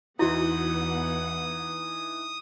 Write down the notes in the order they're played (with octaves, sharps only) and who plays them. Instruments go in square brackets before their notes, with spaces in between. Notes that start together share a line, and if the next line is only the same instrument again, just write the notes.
[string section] E2 B3 F#5 [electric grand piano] E3 D#4 [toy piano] E4 F#4 [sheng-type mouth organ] D#6